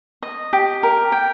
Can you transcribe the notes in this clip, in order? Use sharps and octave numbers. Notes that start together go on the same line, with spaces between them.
D#5
G4
A#4
G5